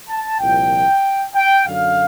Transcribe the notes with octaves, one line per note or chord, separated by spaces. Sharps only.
A5
C2 A#2 F3 G5
G5
F#2 D3 F#3 F5